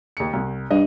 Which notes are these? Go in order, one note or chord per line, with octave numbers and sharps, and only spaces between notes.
D#2 C#7
C2
G2 D#5